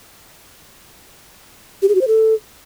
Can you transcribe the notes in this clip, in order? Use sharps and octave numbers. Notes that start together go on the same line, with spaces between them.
G4
G#4
F#4
C5
A4